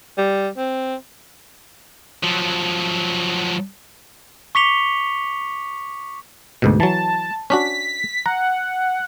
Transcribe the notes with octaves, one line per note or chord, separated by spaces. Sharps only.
G3
C4
F3 F#3
C#6 D6 B6 C#7 F7 G7
D2 G#2 B2
E3 F#3 A5
C#4 D4 F#4 B6
F#5 A#5